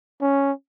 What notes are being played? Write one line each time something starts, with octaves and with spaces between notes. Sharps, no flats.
C#4